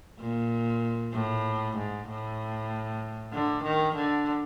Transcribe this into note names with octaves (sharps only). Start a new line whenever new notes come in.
A#2
A2
G#2
A2
D3
D#3
D3